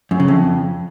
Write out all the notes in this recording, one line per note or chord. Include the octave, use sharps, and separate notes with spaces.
F#2
C#3
F2